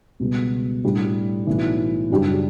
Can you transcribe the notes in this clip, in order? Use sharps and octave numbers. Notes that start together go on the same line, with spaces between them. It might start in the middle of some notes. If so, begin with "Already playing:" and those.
C#2 B2 G3 B3
A2 G3 D4
B1 A2 E3
F#2 C#3 G3 D4 G4